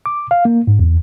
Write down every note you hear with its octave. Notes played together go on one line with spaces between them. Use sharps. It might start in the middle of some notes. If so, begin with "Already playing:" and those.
D6
F5
A#3
G#2
E2